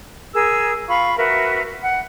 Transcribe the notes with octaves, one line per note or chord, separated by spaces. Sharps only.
G#4 A#4 E6
F4 F5 B5 C#6
F#4 A#4 B4 E5
F#5